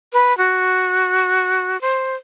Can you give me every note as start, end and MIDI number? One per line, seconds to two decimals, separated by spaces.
0.13 0.36 71
0.38 1.79 66
1.81 2.16 72